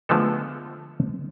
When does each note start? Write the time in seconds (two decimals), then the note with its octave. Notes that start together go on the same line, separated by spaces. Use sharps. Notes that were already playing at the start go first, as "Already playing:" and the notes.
0.09 D3 F3 G#3 A3 B3 A4